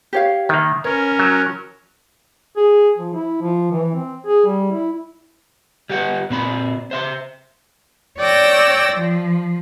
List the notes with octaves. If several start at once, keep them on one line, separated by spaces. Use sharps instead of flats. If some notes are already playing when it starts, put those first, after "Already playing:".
G4 C#5 F5
D#3 A#3 E5
C#4 A#4 B4 C#5
F#3
G#4
F3
E4
F3
E3
C4
G#4
G3
E4
G3 G4 B4 F#5
A#2 C4 B5
C5 E5 C6
C#5 D5 G5 E6 A#6
F3